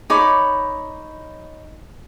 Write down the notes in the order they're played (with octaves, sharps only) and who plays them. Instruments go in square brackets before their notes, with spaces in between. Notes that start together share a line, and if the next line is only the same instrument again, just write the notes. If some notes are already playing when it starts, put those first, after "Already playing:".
[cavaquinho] D#4 C#5 B5 D6